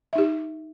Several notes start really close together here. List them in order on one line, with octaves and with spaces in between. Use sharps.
E5 D#4 G4